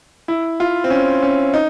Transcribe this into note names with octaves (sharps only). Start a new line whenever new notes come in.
E4
F4
C4
C#4
C#4
D#4